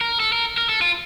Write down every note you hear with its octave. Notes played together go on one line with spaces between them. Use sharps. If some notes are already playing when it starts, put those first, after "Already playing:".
A#4
A4
A#4
A#4
A4
F4